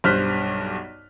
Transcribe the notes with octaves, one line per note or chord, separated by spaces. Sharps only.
B1 G2 C5 F6 F#6 B6